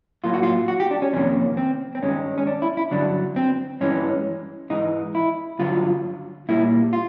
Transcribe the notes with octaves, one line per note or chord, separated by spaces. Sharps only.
A2 F#3 A#3 F4
F#4
F4
F#4
G4
D4
C#4
F2 C3 D#3 G3 A#3 C#4
C4
C4
G2 D#3 G#3 C#4
C#4
D4
E4
E4
G2 D3 F#3 D4
C4
G2 E3 G#3 C#4
G#2 E3 G#3 D#4
E4
G2 D3 F#3 F4
A#2 G3 A#3 E4
F4